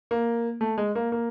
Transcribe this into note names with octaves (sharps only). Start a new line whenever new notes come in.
A#3
A3
G#3
A#3
A#3